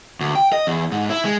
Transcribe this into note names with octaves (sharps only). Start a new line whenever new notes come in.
D2
G5
D#5
E2
G#2
E4
G#3